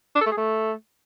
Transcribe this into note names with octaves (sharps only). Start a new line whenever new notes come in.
D4
A4
A3
G#4
A3